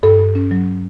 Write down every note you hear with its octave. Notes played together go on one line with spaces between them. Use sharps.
G2 A4
G2
C#4
F#3